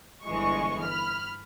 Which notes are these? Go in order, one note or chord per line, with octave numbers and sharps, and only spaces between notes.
G1 E3 G#3 C#6
B5 F6